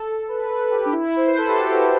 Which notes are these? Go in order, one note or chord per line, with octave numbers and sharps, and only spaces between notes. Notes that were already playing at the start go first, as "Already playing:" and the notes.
Already playing: A4
B4
B4
G4
D4
E4
C5
B4
A4
G4
F#4